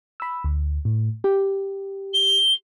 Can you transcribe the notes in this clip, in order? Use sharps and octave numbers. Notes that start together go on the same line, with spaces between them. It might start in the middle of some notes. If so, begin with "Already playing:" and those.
B5 E6
D2
A2
G4
G7